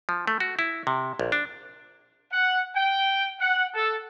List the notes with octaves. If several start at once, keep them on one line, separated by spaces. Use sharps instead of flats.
F3
A3
F#4
E4
C3
A#1
D4
F#5
G5
F#5
A4